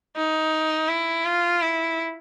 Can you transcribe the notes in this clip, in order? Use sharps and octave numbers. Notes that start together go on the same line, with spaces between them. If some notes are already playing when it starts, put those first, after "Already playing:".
D#4
E4
F4
E4